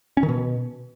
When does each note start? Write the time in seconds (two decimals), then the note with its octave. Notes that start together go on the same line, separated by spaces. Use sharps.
0.17 C#4
0.23 D#3
0.29 B2